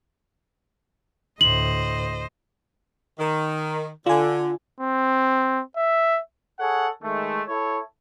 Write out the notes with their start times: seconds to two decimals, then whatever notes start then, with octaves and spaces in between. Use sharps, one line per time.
1.41 D2 A2 C5 D#5 F#7
3.19 D#3
4.06 D3 F4 G#5
4.80 C4
5.76 E5
6.59 G#4 A4 C#5 F#5
7.02 D#3 G#3 A3
7.47 E4 A4 C#5